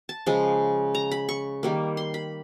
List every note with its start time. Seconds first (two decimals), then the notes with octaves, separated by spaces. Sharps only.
0.09 A5
0.26 C#3 F3 G#3
0.95 A#5
1.12 B5
1.29 C#6
1.63 D#3 G3 A#3
1.97 C6
2.14 B5